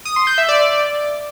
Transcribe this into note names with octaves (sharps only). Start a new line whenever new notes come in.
D#6
C6
G6
E5
D5